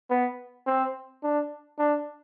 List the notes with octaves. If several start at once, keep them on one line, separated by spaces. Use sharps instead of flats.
B3
C4
D4
D4